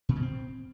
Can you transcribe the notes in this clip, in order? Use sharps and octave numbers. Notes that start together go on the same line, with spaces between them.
A#2
B2
C4